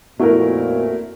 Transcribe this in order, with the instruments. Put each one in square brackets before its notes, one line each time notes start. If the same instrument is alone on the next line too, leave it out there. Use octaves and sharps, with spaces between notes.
[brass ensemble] F2 A#2 [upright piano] A3 E4 A#4 [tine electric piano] B3 F#4